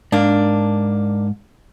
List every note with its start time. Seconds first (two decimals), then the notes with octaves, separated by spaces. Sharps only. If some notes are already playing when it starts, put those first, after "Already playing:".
0.12 G#2 A#3 D4